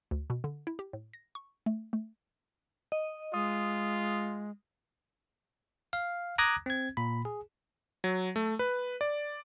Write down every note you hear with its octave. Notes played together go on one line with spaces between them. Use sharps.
D2
B2
D3
E4
G4
A2
A#6
C#6
A3
A3
D#5
G#3 F4 D#6
F5
A#5 D6 D#6 F#6 G#6 A#6
C4 G#6
A#2 B5
G#4
F#3
A3
B4
D5